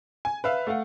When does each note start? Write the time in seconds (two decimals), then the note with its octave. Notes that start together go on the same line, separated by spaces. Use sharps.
0.25 G#5
0.44 B4 E5 F5
0.67 A3 F5 F#5